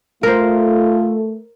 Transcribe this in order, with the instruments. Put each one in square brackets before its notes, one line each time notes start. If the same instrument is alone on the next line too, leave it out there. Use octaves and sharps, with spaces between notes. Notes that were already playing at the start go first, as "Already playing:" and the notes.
[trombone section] A3 [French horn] F4 [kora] A#4 C5